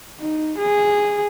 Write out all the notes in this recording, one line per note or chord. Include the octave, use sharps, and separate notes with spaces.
D#4
G#4